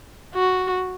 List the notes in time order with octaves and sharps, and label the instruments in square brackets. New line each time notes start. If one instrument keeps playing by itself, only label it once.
[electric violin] F#4